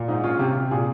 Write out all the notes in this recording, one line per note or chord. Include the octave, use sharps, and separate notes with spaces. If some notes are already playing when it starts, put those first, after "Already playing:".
Already playing: A#2
G#2 D#4
C#4 F4
C3 G4
F4
C3
G4
A#2 G#4